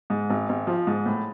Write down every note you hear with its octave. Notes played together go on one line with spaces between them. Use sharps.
G#2
G#1
G#1
F3
G#2
A2